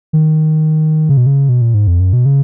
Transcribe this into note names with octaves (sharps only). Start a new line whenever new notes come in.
D#3
C#3
B2
C#3
B2
A#2
G#2
F2
F#2
B2
C#3